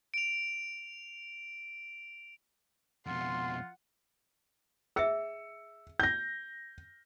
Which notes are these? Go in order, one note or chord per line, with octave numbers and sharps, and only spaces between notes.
D7 F7
F2 B2 F4 F#5 C6
G#4 D#5 E5 E6 C#7
G6 A#6